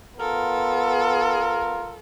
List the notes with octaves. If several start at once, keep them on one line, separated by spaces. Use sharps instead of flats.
B3 F4 A4 A#4